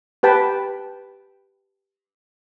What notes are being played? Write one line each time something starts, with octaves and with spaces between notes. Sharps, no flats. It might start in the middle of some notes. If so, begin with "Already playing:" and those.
G4 B4 G5 A5 B5